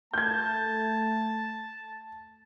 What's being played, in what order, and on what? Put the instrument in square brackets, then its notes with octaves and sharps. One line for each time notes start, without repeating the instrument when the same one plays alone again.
[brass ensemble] A3 [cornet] A5 [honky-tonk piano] G6 G#6